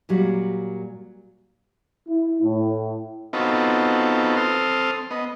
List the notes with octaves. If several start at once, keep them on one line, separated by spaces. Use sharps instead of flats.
A#2 F#3 G3
E4
A2
B3 C4 D#4 F4 F#4 A4
C4 A4 C6 D#6 F6
B3 D#5